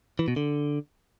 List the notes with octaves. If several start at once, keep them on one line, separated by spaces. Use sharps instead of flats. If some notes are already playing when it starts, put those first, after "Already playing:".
E3
B2
D3